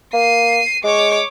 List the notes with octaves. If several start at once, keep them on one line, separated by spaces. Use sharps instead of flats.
A#3 C7 D#7
G#3 C#5 D6